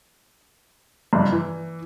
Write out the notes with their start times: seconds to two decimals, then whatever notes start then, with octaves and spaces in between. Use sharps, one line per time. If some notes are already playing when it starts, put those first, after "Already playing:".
1.13 F#1 G2
1.32 E3